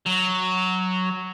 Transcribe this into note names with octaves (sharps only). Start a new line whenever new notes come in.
F#3